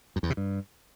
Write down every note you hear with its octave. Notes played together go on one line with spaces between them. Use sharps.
F#2
E2
C3
G2